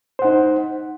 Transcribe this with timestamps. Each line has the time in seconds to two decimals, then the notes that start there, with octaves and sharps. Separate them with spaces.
0.19 C5
0.22 F#5
0.25 D#4